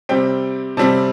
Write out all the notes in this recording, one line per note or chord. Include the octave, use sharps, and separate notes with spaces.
C3 G3 C4 G5
C3 G3 C4 A5